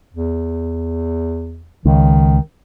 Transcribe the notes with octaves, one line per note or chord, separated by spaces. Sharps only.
E2
C#2 D#3